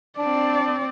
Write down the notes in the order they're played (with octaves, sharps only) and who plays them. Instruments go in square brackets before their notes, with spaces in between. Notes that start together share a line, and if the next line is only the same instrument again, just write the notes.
[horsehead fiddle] C4 D5 [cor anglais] D4